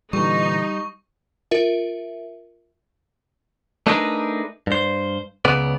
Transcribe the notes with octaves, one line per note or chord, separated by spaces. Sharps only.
A#2 D3 E3 G3 D#4 C#6
F4 A#4 E5
A3 D4 D#4 G#4 A#4 B4
G2 C5
C#2 C#3 B3 D5